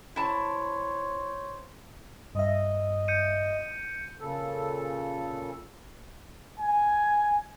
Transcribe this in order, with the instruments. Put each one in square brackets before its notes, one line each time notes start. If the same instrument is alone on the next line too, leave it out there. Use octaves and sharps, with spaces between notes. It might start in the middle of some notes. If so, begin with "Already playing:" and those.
[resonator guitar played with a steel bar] E4 A5 [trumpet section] C5 C#5
[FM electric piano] G2 E5 [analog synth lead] D#5
[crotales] G6 C#7 D#7
[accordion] A#2 C#3 A4
[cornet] G#5